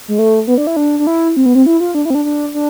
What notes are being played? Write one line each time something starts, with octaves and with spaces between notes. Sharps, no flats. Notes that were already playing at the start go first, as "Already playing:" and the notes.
G#3
A3
B3
D4
E4
D4
D4
E4
C4
B3
C4
E4
F4
D4
E4
C4
D4
D4
D4